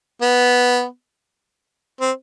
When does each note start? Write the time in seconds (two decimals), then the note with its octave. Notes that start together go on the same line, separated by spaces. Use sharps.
0.22 B3
2.01 C4